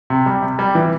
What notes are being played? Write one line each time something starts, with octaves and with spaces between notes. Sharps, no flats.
C3
G3
C3
G3
E3